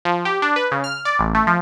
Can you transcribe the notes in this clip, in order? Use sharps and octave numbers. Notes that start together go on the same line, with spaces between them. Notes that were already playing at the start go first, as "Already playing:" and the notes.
F3
G4
D4
B4
C#3
F6
D5
A1
A3
F3